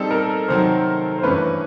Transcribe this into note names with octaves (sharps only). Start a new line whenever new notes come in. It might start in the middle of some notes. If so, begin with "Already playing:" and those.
Already playing: G3 C4 D#4 G#4 A4
A#4
C3 D#3 F#3 C5
C5
G2 E3 A3 C#4 B4